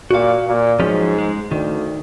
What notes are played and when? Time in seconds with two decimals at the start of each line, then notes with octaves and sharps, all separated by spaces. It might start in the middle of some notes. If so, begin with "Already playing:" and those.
0.11 A#2 F#4 F5
0.47 A#2
0.80 G#2 F3 F#3 C#4
1.18 G#3
1.51 D2 D#3